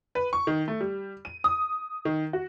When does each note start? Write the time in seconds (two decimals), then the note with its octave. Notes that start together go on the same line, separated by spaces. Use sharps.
0.15 B4
0.33 C#6
0.47 D#3
0.68 A3
0.81 G3
1.25 D#7
1.44 D#6
2.05 D#3
2.33 F#4